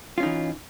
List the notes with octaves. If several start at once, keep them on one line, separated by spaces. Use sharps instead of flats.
E3 C#4 D#4 F4